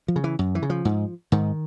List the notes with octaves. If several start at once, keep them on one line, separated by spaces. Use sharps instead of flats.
F3
C#3
E3
F#2
E3
C#3
F3
G#2
G#2 D#3